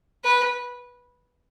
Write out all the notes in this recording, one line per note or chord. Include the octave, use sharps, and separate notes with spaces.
B4